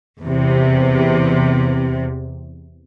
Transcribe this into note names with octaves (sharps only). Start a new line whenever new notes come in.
E2 C3